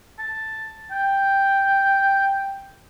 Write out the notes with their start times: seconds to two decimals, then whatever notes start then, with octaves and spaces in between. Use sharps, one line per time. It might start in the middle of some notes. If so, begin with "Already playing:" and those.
0.19 A5
0.91 G5